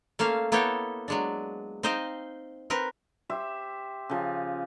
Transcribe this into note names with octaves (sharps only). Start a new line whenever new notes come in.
A3 A#3 C#4 F5
A#3 B3 E4 A4 C#5 G5
F#3 G#3 D4
C4 D#4 C5 D#5 F5 G5
C4 A#4 B4
G4 C5 E5
C#3 F3